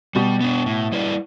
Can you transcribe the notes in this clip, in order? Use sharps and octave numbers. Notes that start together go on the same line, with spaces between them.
B2 G3
B3 D4
A2
G3 E4 B4 D5